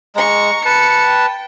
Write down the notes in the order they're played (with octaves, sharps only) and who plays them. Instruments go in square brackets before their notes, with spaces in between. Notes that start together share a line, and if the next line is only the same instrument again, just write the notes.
[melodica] G#3 [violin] A#5 C#6
[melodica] B4 A5 [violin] C#7
[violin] G5